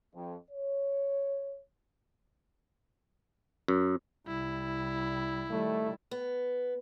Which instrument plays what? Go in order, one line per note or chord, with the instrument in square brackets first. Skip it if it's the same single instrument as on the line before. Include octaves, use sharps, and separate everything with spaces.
[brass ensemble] F2
C#5
[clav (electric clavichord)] F#2
[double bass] C2 G3 [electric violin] E4
[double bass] D#3 G3 [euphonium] A3
[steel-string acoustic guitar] B3